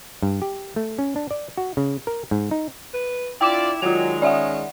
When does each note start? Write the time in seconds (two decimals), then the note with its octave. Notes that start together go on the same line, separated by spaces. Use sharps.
0.22 G2
0.42 G4
0.76 A3
0.99 C#4
1.16 D4
1.31 D5
1.58 F#4
1.77 C#3
2.07 A#4
2.31 G#2
2.51 D#4
2.94 B4
3.41 D4 E4 F4 D5 G5 D6 E7
3.82 D#3 F#3 G#3 F4 F7
4.22 C#4 D5 E5 F#5